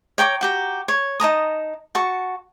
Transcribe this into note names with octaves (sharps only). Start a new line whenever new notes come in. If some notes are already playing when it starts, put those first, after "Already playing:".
C#5 G5 A#5 D6
F#4 G4 A#5
C#5
D#4 A5 A#5 D#6
F#4 A5 C#6